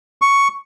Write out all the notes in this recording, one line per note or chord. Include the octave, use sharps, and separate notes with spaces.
C#6